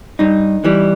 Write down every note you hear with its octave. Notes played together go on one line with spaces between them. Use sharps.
G2 D#4
E3 G3